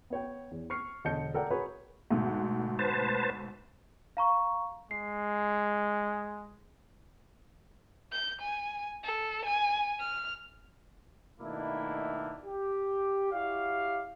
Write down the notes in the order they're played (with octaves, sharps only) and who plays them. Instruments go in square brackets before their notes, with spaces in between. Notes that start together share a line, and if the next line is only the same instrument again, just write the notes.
[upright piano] B3 C#5 G5
E2
C#6 F6 C7 C#7
E1 D3 D#5 A5 G6 C#7
A4 A#4 D5 F#5 G5
F#4 G#4 A#4 B4 C#5
[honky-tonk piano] D2 G#2 B2
[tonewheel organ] B4 C5 A5
[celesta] F5 A#5 C#6
[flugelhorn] G#3 [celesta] C7
[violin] G6
G#5
A4
G#5
F6
[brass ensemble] B2 D#3 A3 A#3 D4 E4
G4
E4 F#4 G4 D5 F5